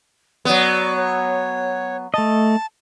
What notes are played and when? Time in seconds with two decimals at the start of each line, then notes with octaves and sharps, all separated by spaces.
0.45 F#3 B3 D5
0.96 C#5
2.14 A3 D#5 A5